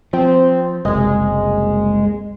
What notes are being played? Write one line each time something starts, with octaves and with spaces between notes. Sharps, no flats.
F3 C4
F#1 C2 G#3